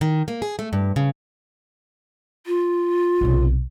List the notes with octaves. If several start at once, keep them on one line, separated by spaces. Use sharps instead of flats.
D#3
A#3
G#4
A3
G2
C#3
F4
B1 C3